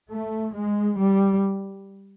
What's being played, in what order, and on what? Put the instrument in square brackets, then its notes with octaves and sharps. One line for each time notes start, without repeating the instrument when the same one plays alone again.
[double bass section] A3
G#3
G3